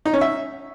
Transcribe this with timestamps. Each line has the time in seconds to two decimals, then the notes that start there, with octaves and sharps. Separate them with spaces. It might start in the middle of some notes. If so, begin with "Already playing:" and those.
0.06 D#4
0.13 C#4
0.21 E5